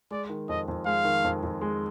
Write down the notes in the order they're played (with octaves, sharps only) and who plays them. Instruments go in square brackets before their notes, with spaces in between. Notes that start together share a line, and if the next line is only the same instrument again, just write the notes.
[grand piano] G#3 [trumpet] D5
[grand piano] D#3
[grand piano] F2 [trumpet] D#5
[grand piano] F2
[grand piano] G#3 [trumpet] F5
[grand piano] D#3
F2
F2
G#3